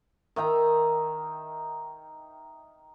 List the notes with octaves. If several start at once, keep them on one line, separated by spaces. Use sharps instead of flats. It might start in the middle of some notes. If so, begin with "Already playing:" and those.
D#3 E5 G5 A#5